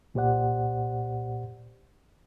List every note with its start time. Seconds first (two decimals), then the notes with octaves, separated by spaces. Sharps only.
0.14 C2 A#2 G4 C5 D5 F#5